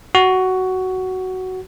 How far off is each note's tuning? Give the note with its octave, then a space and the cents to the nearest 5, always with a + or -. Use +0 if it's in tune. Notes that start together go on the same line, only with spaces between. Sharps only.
F#4 +10